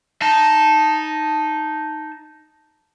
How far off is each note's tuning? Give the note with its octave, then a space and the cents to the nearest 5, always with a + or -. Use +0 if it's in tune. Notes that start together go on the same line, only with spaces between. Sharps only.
D#4 +0 A5 +0